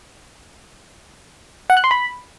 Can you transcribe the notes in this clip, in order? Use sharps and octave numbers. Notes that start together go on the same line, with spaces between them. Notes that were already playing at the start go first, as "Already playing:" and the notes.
F#5
F#6
C6
B5